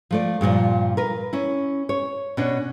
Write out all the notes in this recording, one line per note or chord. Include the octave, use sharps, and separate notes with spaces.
F3 A3 D5
G2 A#2 E3 F3
A#4 B4
C#4 E4
C#5
B2 C#4 D4